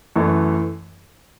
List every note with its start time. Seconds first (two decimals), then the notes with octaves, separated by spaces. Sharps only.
0.16 F#2 E3 A3